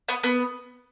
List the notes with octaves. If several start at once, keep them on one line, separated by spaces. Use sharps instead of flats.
B3
B3